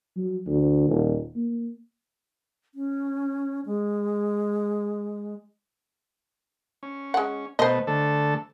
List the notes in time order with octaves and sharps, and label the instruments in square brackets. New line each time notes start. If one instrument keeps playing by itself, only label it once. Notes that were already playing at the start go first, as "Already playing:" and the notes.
[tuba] F#3
D2
D#1
A#3
[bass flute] C#4
G#3
[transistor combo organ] C#4
[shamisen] G#3 F#5
[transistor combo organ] B2 A3 B3 [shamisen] C5 D#5
[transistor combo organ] D3 A3 A4